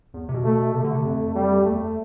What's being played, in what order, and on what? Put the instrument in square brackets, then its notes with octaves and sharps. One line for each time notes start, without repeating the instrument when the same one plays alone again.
[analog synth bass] E2
C3
B2
[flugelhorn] A3
[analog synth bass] C3 [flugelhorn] A3
[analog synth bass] D3
C3
F2
[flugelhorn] G3
[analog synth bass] E2 [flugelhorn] A3